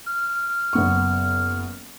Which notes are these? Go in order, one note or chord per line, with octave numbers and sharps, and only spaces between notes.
F6
F#1 B3 C#6